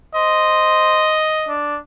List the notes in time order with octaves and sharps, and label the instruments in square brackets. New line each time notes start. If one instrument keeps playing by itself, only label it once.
[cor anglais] C5 [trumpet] D#5
[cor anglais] D4